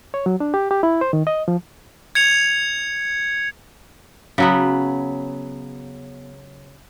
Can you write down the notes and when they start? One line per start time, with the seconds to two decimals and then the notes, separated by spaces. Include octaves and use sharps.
0.14 C#5
0.26 F#3
0.40 D4
0.54 G4
0.71 G4
0.83 E4
1.01 C5
1.13 D#3
1.27 D#5
1.48 F3
2.15 G#6 C#7 F7
4.38 C#3 F#3 B3